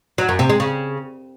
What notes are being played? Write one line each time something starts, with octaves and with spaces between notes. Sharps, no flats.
F#3
F#2
C3
G#3
C#3